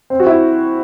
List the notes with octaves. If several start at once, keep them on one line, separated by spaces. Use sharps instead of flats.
C4
F#4
E4